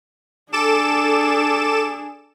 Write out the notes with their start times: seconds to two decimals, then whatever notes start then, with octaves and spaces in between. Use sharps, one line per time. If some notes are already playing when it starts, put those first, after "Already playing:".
0.52 D4 G#4 A4 D6 E7